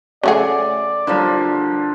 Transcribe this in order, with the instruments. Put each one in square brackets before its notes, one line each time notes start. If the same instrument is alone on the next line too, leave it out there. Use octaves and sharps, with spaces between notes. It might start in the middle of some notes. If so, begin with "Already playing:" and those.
[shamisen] C#3 A3 G#4 [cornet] D5 [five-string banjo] F5 F#5
[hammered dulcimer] D3 F3 A#3 [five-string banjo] G3 E4